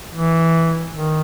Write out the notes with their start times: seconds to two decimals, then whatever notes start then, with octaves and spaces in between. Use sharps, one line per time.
0.15 E3
0.94 D#3